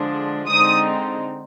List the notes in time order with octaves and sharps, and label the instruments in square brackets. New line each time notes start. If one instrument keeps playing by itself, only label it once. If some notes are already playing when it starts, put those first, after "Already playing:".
Already playing: [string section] D3 F3 G#3 D4
D3 G#3 C4 D#4 D#6